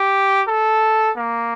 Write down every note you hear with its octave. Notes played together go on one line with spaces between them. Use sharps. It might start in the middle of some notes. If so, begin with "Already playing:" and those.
Already playing: G4
A4
A#3